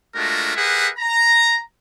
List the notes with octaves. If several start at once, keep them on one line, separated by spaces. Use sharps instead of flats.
G#3 A3 D4 F4 F#4 A#4
G4 G#4 A#4 B4 E5 F#5
A#5